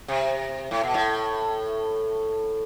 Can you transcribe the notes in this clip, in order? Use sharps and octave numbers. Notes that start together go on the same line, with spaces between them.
C3
A2
B2
A2